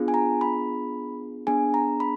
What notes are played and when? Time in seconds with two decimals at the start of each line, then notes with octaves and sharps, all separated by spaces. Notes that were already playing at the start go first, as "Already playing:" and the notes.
Already playing: B3 D4 F4 G#4
0.08 G#5
0.14 A#5
0.41 B5
1.47 B3 D4 G#4 G#5
1.74 A#5
2.00 B5